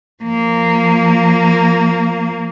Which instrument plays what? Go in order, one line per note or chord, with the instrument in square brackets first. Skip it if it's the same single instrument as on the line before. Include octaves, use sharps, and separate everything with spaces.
[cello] F3 A#3